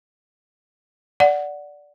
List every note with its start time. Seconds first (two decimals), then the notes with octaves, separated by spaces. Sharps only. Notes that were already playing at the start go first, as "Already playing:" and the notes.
1.20 D5 F#5